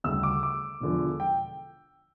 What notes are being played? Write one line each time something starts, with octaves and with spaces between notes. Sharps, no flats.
D2 C#3 G3 E6
D6
D6
E1 E2 D3 F3
G5